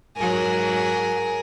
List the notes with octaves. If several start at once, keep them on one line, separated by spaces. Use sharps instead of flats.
G#2 F#3 G#4 A#4